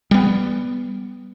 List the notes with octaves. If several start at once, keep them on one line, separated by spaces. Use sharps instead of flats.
G3 B3